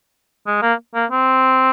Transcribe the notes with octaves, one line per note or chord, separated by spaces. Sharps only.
G#3
A#3
A#3
C4